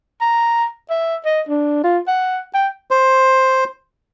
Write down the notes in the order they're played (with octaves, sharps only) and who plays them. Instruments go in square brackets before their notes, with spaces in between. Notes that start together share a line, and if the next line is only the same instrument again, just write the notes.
[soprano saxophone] A#5
E5
D#5
D4
F4
F#5
G5
[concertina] C5